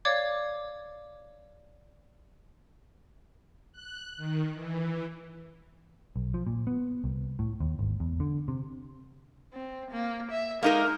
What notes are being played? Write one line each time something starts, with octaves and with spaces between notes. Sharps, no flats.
C#5 D5 F5 D6 G#6
F#6
D#3
E3
B1
F3
A#2
B3
C2
A2
D#2
G#1
E2
D3
C3
C4
A#3
E5
G#3 A#3 D#4 A#4